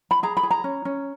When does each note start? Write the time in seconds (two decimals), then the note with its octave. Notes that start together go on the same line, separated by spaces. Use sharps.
0.11 B5
0.23 G#4 A#5
0.37 B5
0.43 G#4
0.51 A#5
0.64 C#4
0.85 C#4